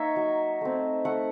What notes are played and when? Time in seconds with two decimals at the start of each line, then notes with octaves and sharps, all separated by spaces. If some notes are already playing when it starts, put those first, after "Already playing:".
Already playing: A#3 D#4 C#5 E5
0.16 F#3
0.61 A3 C4
1.05 A3 F#5